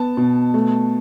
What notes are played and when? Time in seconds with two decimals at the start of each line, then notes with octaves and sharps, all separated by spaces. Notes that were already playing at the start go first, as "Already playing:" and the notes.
Already playing: B3 A5
0.17 B2
0.54 A3